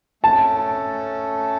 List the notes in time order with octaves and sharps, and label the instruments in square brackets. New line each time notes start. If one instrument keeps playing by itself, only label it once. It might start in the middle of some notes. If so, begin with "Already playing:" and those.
[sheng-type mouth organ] A3 C#4 A4 [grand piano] A5